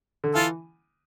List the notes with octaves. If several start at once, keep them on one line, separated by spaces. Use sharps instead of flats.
D3
E3 F4 A4